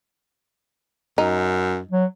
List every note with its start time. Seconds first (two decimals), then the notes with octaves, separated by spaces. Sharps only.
1.18 F#2 D#4
1.91 F#3